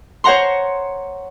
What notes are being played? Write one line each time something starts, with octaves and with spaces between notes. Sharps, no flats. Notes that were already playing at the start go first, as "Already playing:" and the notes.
C5 C#5 F#5 A#5 C6